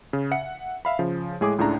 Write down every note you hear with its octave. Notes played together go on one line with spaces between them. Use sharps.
C#3
E5 F#5 C#7
E5 F5 B5
C#3 F3
A2 G#3 G#4 C#5 D6 D#6
C#2 A2 C#3 D4 A#5